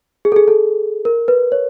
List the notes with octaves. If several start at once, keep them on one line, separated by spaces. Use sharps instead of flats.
G#4
A4
G#4
A4
A#4
B4
C#5